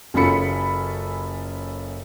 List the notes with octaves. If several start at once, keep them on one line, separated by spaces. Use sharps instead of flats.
F#1 C#4 F4 A4 B5 C#7